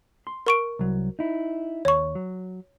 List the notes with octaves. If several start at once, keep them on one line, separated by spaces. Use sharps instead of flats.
C6
A#4 C#6 D7
C2 F#3
D#4 E4
D#2 C#5 C#6
F#3